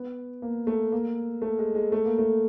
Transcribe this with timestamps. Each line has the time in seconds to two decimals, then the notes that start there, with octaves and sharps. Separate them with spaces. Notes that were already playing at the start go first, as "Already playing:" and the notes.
Already playing: B3
0.42 A#3
0.67 A3
0.92 A#3
1.42 A3
1.59 G#3
1.75 G#3
1.92 A3
2.05 A#3
2.18 A3